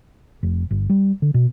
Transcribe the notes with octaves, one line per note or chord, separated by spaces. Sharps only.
F1
G1
G3
D3
B2